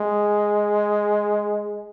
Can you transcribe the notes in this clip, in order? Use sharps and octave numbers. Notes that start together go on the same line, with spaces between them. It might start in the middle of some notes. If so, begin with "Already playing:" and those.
Already playing: G#3